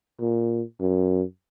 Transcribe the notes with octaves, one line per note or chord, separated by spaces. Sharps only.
A#2
F#2